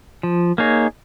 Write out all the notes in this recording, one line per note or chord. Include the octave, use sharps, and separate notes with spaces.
F3
A#3 D#4 G#4 C#5